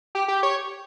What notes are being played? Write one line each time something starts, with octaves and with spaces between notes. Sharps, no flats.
G4
G4
C#5